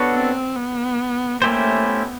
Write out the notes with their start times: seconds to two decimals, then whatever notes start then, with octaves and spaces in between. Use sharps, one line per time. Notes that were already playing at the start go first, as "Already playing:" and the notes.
Already playing: B3 D4 F#4 A4 C#5
0.14 C4
0.56 B3
1.42 A3 A#3 C#4 E4 G4 C5
1.85 B3